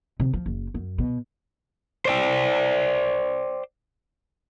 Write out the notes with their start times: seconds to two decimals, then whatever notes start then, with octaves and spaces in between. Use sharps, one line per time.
0.20 C3
0.33 F3
0.46 F#1
0.74 F#2
0.98 B2
2.05 C5 D5 G5